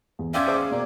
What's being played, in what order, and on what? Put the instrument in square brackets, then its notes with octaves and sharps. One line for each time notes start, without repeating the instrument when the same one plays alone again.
[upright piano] E2
[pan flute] C#4 [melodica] D5 E5 G5 [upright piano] F5 C6 G#6
[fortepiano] G#4 C5 D6
[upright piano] B2 D5 [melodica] A#3